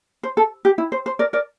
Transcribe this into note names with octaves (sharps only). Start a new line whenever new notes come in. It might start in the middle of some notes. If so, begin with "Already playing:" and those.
C5
A4
G4
E4
C5
C5
A#4 D5
A#4 D5